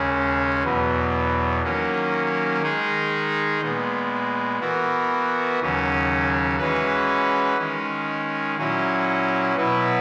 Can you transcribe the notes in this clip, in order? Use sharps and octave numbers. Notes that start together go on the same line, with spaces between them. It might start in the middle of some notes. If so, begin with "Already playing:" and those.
Already playing: D#2 C#3 G#3 C#4
E2 B2 F#3 B3
D#3 F#3 A#3 C#4
D#3 G#3 D#4 G#4
A#2 G#3 B3
E3 B3 F#4 A#4
D#2 C#3 F#3 C#4
E3 G#3 C#4 F#4 B4
D#3 G#3 C#4
A#2 F#3 C#4 E4
B2 F#3 B3 E4 B4